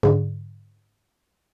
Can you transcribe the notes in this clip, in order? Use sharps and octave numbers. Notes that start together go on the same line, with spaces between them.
G#2 D3